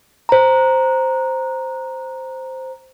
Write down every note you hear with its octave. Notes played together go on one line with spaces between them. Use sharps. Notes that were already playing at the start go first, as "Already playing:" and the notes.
C5 A#5